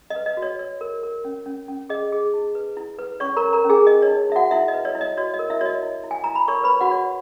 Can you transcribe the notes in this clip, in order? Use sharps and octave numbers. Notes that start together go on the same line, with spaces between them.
D#5
B4
D#5
F#4
C#5
C#5
A#4
A#4
C#4
C#4
C#4
G#4 D#5
G#4
D#4
B4
E4
B4
C#4 C#5 C#6
A#4 A#5
C#5
A#4 A#5
C#4
G#4 G#5
G#4 D#5
C#5
D#4
D#4 E5
F#4 F#5
E4 E5
D#5
B4
C#5
E4
D#5
F#4 C#5
D#5
A#4
E4 E5
F#4 C#5 D#5
E4
E4
G#5
E4 A#5
B5
A#4 C#5 C#6
B4 B5
C#5
F#4 F#5
C#5